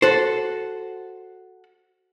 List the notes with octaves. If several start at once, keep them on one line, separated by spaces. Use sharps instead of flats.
F#4 A4 C5